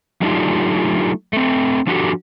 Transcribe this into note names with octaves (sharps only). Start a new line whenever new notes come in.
F#3 A3 D4 D#4 F4 G4
A3 C4
F3 D4 F#4 G4 A4